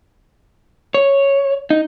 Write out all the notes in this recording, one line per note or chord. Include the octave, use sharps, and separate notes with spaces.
C#5
D#4